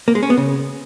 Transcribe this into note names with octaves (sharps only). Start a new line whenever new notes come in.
A#3
G#3
C#4
B3
C#3